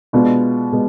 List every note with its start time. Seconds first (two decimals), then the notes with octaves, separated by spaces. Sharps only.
0.13 B2 G#3 B3 D4 F4
0.72 B2 G#3